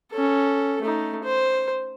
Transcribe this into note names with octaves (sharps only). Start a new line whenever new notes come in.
C#4 A4
A3 D#4
C5